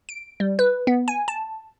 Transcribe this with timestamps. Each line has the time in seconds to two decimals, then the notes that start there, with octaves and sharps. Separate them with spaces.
0.09 D7
0.40 G3
0.59 B4
0.87 B3
1.08 G#5
1.28 A5